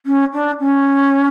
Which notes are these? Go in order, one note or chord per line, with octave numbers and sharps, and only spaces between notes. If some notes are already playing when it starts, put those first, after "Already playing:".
C#4
D4
C#4